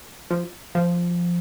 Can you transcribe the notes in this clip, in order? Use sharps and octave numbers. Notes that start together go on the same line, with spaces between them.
F3
F3